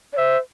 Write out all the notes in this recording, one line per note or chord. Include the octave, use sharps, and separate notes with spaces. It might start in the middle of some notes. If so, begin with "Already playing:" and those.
D5
C5 E5